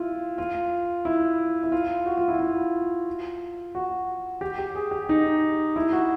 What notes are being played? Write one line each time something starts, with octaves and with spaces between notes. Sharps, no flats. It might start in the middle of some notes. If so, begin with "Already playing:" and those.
Already playing: E4 F4
F4
E4
E4
F4
F#4
F4
E4
F4
F#4
G4
G4
G#4
G4
D#4
E4
F#4